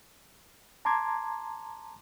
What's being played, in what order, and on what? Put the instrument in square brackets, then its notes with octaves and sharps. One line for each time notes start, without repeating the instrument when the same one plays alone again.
[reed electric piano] A5 A#5 C6 D6 G#6